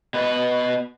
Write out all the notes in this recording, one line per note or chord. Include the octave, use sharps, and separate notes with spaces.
B2 B4